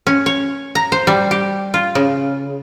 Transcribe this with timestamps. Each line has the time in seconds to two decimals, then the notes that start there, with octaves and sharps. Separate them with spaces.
0.07 C#4
0.26 C#5
0.75 A#5
0.92 C5
1.07 G3
1.31 G4
1.74 F4
1.95 C#3